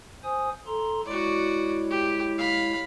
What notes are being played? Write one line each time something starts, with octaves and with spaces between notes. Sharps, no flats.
C5 G#5 D#6
A4 A#5 C6
G#3 E4 F#4 C#5 D5
G4
F5 B5